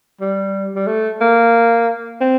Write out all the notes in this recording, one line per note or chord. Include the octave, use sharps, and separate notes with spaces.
G3
G3
A3
A#3
C4